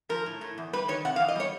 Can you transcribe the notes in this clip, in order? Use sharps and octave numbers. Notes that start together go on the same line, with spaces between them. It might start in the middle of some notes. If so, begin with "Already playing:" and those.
F3 A#4
A2
A2
E2
G3 B4
D#3 C#5
C3 F#5
F5
E2
D#5
G3 C#5